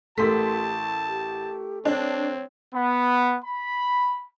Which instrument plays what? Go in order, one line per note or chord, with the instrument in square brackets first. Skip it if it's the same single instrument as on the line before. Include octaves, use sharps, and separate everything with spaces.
[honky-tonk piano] A1 C6 B6 [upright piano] A3 A4 A#4 [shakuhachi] G4 [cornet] A5
[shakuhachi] G4
[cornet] C4 [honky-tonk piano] D4 [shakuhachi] C#5
[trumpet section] B3
B5